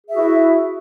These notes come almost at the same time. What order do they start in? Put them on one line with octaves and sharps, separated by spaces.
G#4 E5 F#4 E4